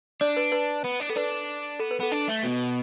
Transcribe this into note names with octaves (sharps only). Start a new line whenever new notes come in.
D4 D5
B4
B4
B3
D4
B3 A4
D4 B4
B3 A4
B4
B3 A4
D4
A3
B2